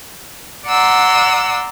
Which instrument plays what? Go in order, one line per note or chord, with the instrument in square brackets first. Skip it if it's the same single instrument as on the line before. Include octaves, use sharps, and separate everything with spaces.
[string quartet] D5 F#5 A#5 C6 E6